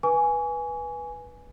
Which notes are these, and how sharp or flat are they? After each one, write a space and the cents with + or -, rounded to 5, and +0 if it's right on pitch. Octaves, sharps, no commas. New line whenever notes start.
B4 -15 G#5 +0 C#6 +45